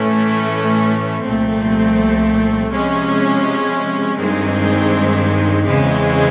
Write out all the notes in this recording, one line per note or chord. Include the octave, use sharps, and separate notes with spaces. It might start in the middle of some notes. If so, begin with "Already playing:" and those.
Already playing: A2 E3 A3 C#4
C2 A#2 F3 A3 C4
C3 F3 G#3 C#4
G2 D#3 G#3 C4
E2 C#3 E3 G#3 C4